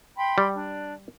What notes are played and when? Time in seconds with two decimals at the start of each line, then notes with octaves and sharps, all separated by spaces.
0.16 G5 B5 C6
0.38 G3
0.55 D4